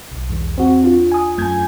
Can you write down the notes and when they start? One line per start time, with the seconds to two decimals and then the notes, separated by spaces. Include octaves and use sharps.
0.12 B1
0.29 E2 G#2
0.58 C4 F#4
0.82 D4 F4
1.12 G#5 D#6
1.38 F#2 A3 G#5 G6 G#6